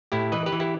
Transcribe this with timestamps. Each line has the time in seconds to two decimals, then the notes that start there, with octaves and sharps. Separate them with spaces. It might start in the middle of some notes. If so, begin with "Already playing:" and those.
0.12 A2 E4 G4
0.32 E3 B4 D#5
0.46 G4 B4
0.52 E3
0.60 E4 G4